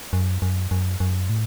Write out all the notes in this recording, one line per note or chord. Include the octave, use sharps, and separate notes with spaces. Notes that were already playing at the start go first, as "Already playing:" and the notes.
F#2
F#2
F#2
F#2
A2